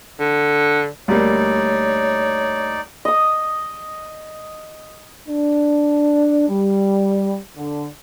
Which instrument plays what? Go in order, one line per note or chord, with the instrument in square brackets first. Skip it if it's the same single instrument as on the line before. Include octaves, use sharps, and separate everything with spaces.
[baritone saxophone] D3
[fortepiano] D2 G3 A#3 [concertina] D#4 D5 [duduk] C#5
[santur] D#5 D#6
[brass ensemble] D4
G3
D3